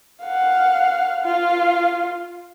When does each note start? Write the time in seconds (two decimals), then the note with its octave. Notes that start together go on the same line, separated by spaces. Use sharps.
0.23 F5 F#5
1.24 F4